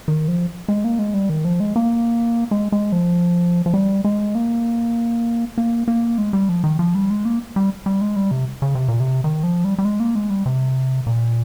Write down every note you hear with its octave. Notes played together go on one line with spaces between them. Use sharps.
D#3
F3
G#3
A#3
G#3
G3
D#3
F3
G#3
A#3
G#3
G#3
F3
F3
G3
G#3
A#3
A#3
A#3
G#3
G3
F3
D#3
F3
G3
G#3
A#3
G3
G3
G#3
G3
C3
C#3
C3
A#2
C3
D#3
F3
G3
G3
G#3
A#3
G#3
G3
C3
A#2